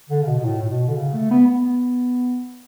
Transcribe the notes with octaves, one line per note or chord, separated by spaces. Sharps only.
D3
C#3
B2
B2
A2
A2
B2
D3
C#3
A3
B3
B3